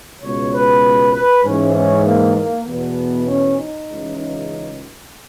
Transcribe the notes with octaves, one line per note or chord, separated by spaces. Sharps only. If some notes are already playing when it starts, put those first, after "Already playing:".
C#2 B2 C#5
B4
B4
G#2 E3 C#4
C#4
A#3
A#3
E2 B2 B3
C#4
D#4
C#2 C#3 E3
D#4